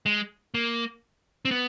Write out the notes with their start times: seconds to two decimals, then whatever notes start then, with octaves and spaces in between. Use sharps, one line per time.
0.06 G#3
0.54 A#3
1.45 C4
1.51 B3